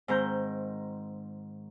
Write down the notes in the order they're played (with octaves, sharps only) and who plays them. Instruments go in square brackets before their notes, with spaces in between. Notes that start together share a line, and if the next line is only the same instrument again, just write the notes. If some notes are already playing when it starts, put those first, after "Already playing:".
[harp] G#2 D#3 C4 A#5 G6